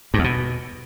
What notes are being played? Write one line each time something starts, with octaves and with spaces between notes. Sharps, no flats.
G2
E2
B2